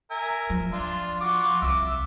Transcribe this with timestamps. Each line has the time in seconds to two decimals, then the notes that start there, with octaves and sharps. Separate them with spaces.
0.11 A#4 E5 G#5
0.50 F3
0.73 D4 F4
1.21 F4 F#4 D6
1.62 C2 E5 D6 E6